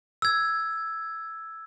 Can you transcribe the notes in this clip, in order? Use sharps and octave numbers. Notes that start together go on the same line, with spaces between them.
E6 G#6